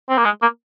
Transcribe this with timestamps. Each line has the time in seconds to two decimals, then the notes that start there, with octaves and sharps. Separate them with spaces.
0.09 C4
0.18 A#3
0.25 G#3
0.42 A#3